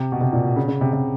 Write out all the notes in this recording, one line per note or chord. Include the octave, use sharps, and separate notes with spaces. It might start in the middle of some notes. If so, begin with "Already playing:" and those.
Already playing: C3
B2
C3
A#2
B2
C#3
C#3
C3
C3